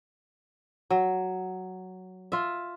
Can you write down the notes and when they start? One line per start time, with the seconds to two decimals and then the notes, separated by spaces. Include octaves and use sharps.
0.90 F#3
2.32 F4 E5